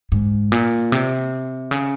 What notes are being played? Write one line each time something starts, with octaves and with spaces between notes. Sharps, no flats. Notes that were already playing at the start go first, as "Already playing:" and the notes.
G#2
A#2
C3
C#3